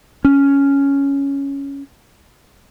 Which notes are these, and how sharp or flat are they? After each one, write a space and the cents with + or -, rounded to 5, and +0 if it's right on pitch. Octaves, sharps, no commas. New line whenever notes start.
C#4 +5